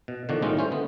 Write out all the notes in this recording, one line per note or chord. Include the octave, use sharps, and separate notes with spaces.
B2
B2 D3 D#3 F3 D4 F#4
A2 D#3 G3 G#3 C#4 F4
A3 C#4 C5
D3 B3